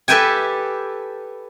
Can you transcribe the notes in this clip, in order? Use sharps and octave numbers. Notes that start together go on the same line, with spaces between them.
G4 A4 B4 E5 G5 G#5